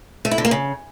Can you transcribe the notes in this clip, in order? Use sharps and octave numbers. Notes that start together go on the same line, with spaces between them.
A3
E4
D3
A#3
C#3